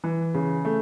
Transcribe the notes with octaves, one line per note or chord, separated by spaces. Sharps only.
E3
C#3
A3